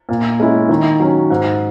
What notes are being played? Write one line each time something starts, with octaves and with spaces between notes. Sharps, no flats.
A#2
G#3 C#4 E4
D#3
F#3 C#4
G#2